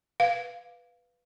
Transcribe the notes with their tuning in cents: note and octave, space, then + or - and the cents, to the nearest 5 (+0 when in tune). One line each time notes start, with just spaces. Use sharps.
B4 +0 F5 +0